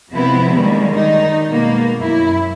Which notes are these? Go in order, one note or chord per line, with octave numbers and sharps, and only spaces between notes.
C3 F3 G#3 B3 C4 E4
D3 D#3 G3 G#3 A#3
D#3 G3 D#4
B2 G#3 A#3 B3
F#2 E4